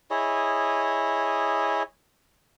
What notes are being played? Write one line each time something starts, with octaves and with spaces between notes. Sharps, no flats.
E4 G#4 C#5 D#5